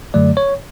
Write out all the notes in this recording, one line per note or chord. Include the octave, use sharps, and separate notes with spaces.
F#2 D3 F#3 A3 D5
C#5